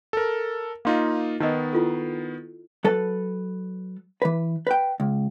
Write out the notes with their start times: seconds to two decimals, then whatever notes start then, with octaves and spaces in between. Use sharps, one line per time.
0.13 A4 A#4
0.85 A#3 D#4 F4 F5 C6
1.40 D#3 B3 D#4 B4 D#5
1.73 E4 F4 A4
2.84 F#3 A4 B4 A5
4.22 E3 B4
4.67 B4 G5
5.00 C#2